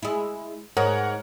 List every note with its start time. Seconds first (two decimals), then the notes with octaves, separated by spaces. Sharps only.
0.03 G#3 E4
0.77 G#2 A#4 C#5 F#5